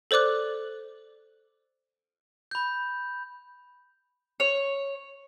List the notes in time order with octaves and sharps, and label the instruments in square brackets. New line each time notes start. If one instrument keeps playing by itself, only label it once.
[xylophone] A4 C5 D5 D6 F#6
[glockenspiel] B5 G6
[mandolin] C#5